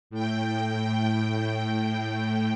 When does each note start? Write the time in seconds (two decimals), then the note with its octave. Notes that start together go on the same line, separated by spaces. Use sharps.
0.10 A2 G5